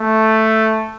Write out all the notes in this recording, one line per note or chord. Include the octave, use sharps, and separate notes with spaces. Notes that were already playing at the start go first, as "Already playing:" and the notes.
Already playing: A3